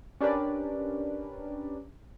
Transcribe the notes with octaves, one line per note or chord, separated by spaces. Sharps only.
C#4 D4 G4 A#4 B4 D5